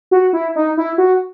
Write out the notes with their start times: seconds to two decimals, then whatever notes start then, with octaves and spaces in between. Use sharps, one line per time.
0.11 F#4
0.33 E4
0.56 D#4
0.77 E4
0.98 F#4